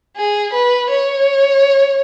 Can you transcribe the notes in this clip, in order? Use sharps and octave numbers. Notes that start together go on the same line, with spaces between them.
G#4
B4
C#5